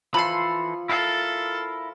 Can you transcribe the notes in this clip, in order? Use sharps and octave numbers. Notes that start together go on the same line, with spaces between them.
E3 F3 A4 B5 C6
E4 A4 A#4 F5